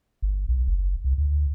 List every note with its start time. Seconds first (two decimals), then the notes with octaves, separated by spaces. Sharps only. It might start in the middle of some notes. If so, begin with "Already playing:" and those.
0.22 G1
0.48 B1
0.67 F#1
1.04 C2
1.18 D2